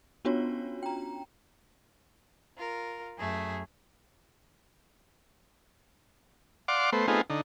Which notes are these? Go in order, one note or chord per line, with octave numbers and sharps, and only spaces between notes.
B3 C#4 D4 F4 F#4 C#5
G5 A#5
F4 A#4
F#2 A3 G#4
D5 F5 F#5 C6 D6
A3 B3 C5
A3 B3 C4 D#4 F4 G#4
D3 D#4